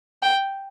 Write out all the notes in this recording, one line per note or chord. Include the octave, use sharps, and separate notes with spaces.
G5